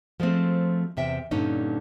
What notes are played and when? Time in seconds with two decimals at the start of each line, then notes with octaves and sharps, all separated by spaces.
0.20 F3 G#3 A3 C4
0.97 E2 C3 E5 G5
1.31 G2 A#2 D3 C#4 D#4